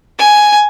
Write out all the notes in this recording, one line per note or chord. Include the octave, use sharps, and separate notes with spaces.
G#5